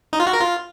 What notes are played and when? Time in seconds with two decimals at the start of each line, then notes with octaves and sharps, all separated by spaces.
0.13 D#4
0.20 F4
0.27 F#4
0.33 A#4
0.40 F4